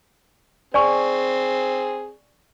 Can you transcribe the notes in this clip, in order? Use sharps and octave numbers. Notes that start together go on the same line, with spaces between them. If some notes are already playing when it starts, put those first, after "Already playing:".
C4 G#4 D5 G#5 C#6